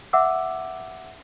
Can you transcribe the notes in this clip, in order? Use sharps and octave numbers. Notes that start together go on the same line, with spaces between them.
E5 F#5 D6 E6